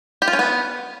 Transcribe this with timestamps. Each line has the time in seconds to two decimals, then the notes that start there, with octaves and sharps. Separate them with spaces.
0.22 G4
0.28 F4
0.33 C#4
0.39 B3